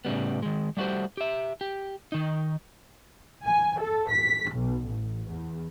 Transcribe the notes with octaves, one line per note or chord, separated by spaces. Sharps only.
A2 C#3 G3 B3
D#3 G#3
G3 A3 F#4 G4 C5
G4 E5
G4
D#3 D#4
G#5
A4
B6
B1
A1
E2